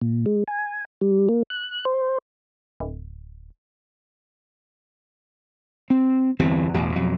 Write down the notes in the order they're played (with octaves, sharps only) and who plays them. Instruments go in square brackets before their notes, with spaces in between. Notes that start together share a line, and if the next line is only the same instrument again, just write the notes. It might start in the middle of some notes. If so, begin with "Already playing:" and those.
[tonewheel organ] A#2
G#3
G#5
G3
A#3
F#6
C5
[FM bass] D1
[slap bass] C4
G1 E2 E3 C4
A1 E2 B2
F2 B2 F#3